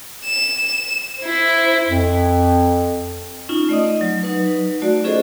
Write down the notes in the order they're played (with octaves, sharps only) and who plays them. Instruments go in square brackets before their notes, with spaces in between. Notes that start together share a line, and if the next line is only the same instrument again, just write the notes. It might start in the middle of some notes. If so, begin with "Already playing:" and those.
[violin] E7
E4 C5
[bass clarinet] F2
[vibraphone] C#4 D#4 F4
A3 D5 D#5 D#6
F#3
F#3 D#4 B4
A3 F#4 D5
C#4 F4 G#4 A4 C5 D#5